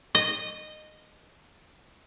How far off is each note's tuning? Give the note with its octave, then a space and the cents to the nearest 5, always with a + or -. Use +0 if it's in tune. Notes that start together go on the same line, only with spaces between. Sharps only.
D#5 -15